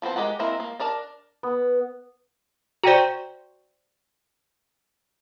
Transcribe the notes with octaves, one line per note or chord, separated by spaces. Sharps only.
F3 B3 C4 C5
G#3 G4 A#4 F#5
G#3 A#3 C4 E4 A#4
A#3
D4 A#4 D5 A5
B3
F#4 C5 D5 G5 A#5